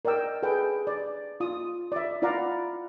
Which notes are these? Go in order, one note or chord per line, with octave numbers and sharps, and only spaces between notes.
A#4 D5 D#5 G5 E6
G#4 A4 B4 G5
D5
F4 D#6
D5 E5
E4 F4 D5 F5 F#5 A#5